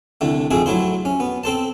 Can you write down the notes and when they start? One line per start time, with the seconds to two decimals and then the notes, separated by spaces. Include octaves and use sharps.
0.21 C2 D3 A3
0.51 F2 G#2 A3 C4 G#4
0.66 F#3 A3 E4 C5
1.05 C#4
1.20 B3
1.44 C4 A4 C5 A5